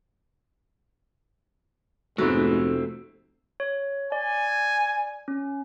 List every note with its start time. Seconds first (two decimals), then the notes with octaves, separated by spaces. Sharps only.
2.18 F1 G#2 A3 B3 C4 F#4
3.60 C#5
4.12 D5 G#5
5.28 C#4